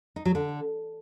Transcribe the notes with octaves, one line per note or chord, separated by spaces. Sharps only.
D#4
F#3
D3